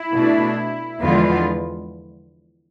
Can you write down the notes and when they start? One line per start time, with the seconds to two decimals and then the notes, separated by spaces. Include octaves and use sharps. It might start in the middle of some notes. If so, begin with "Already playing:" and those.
Already playing: E4
0.12 B2 A3 D4
1.02 E2 D3 F3 G#3 B3 F4